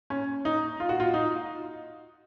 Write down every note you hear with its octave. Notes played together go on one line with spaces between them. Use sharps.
C#4
D#4
F4
F#4
F4
D#4